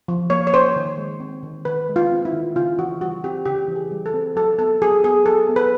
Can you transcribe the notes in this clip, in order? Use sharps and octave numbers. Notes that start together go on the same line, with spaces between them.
F3
A#3 C#5
C#5
C#4 C5
D#3
G#3
C4
D#3
D#3 B4
G#3
F4
C4
E4
D#3
C#3 F4
E3 F#4
G3 F#4
C4 G4
C#3 G4
E3
G#4
G3
A4
C4
F#3 A4
B3 A4
F#3 G#4
B3 G#4
F#3 A4
B3
B4